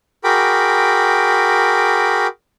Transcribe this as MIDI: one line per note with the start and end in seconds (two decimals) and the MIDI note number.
0.24 2.27 66
0.24 2.27 68
0.24 2.27 70
0.24 2.27 79
0.24 2.27 83
0.24 2.27 86